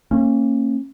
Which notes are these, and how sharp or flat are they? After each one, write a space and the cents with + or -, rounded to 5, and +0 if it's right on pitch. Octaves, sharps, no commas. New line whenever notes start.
A#3 -30 C#4 -30